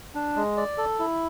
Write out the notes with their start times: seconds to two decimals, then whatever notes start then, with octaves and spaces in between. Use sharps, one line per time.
0.15 D4
0.36 G#3
0.57 D5
0.78 A4
0.99 E4